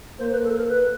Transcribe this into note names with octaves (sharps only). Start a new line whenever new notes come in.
A#3 C5
B4
A4
A#4
B4